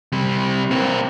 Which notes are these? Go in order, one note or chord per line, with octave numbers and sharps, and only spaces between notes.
C3 G3
A#3 C4